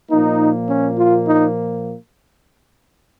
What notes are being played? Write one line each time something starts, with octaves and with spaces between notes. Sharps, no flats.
A#2 F3 A#3 D#4
C#4
F4
D#4